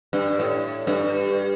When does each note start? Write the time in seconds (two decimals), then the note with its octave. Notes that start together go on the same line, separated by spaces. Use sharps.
0.13 G2
0.40 A2
0.87 G2